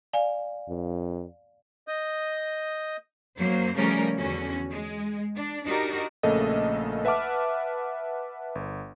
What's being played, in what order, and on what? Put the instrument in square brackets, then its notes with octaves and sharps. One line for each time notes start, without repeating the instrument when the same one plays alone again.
[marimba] D5 F5 G#5
[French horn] F2
[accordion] D#5 D#6 G6
[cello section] F#2 F#3 A#3 C5
C#3 F3 G3 A3 C#4 A#4
E2 D3 C#4 F#4
G#3
D4
D4 D#4 F#4 G4 A#4
[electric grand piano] A#1 C#3 A3 A#3 A4 D#5
B4 E5 F#5 A5 D6 F6
G1